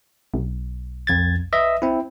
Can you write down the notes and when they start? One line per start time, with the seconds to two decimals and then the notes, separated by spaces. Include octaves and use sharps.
0.34 B1
1.07 F2 G#6 A6
1.53 B4 D#5 E5
1.82 C4 E4